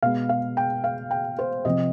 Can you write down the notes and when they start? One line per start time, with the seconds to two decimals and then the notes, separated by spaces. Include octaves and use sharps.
0.03 B2 G#3 B3 F5
0.29 F5
0.57 G5
0.84 F5
1.11 G5
1.39 C5
1.65 C3 F3 C4 D#5